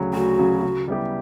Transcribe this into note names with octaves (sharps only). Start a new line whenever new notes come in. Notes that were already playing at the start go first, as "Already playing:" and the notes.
Already playing: D2 C#3 F#3
D2 F#4
C#3 F#3
C#3
G3 B3 E4 G4